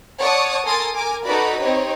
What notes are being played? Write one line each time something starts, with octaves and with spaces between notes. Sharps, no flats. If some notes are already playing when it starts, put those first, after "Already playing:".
C#5 D5 F#5 A5 C#6 D#6
A4 A#4 G#5 C6 D#6 A6
A#4 G#5 D6
D#4 F#4 A4 B4 D5 B5
C4 D#4 G4 C#5